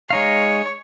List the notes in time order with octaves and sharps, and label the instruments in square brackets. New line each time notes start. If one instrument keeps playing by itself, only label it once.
[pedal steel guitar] G#3 D#4 F5 [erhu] C#5